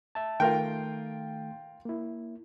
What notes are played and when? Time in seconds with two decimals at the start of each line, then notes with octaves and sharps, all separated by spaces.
0.15 E5 A5
0.40 D#3 A3 F4 A#4 G5 C6
1.85 A#3 E4